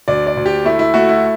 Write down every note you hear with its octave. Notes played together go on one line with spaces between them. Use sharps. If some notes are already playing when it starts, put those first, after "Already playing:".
D2 D5
D5
D2
G4
A3 E4
E4
A3 F#4
E4